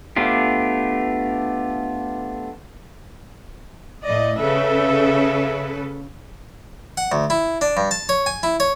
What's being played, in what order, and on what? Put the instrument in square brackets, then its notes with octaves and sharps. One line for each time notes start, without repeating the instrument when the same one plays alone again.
[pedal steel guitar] A3 B3 D4 F4 G4
[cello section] A2 D#5 [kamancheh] D5
[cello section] C#3 A4 B4 [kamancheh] E5
[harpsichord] F#5
D2
E4
D4
G2
A5
C#5
G#5
E4
C#5